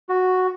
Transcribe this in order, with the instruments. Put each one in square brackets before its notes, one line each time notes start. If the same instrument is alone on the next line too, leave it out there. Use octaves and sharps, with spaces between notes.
[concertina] F#4